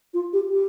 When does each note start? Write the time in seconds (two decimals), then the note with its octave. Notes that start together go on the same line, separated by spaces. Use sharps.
0.14 F4
0.33 G4
0.52 G4